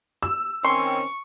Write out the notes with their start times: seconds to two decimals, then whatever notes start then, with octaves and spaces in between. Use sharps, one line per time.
0.23 E6
0.65 D#3 C4 C#4 C6 C#6